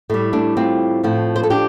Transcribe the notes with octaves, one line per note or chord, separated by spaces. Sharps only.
A2 G3 A3
A3 D4
C4 F4
A2 F3
C5
A4
D4 G4